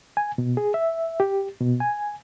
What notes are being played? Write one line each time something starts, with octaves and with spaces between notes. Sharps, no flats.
G#5
B2
G#4
E5
G4
B2
G#5